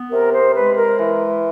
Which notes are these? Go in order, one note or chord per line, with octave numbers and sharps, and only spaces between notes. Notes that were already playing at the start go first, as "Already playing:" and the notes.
Already playing: B3
C3 A#4
C5
G#3 B4
A#4
E3